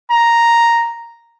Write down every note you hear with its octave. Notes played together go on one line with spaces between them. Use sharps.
A#5